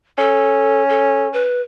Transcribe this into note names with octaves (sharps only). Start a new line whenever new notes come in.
C#4 A4
A4
B4